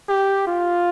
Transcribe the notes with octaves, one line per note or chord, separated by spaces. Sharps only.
G4
F4